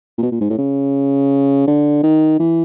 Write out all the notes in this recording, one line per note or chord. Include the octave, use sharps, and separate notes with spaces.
A#2
B2
A#2
G#2
A2
C#3
D3
D#3
E3